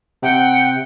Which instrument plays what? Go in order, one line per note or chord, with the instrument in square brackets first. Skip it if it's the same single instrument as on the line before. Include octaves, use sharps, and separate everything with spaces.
[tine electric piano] C3 [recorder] F#5 [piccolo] G5